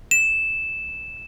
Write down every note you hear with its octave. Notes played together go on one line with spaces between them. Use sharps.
E7